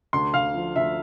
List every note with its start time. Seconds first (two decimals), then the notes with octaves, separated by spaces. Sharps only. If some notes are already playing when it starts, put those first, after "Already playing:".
0.13 D2 C6
0.34 D2 F5
0.55 F3
0.76 D2 E5